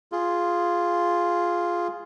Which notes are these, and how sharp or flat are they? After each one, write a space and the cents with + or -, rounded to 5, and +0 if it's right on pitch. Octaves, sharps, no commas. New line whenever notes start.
F4 +0 G#4 +0